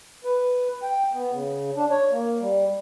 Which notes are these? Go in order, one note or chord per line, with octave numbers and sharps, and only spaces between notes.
B4
G5
B3
C#3
D4
C#5
A#3
G3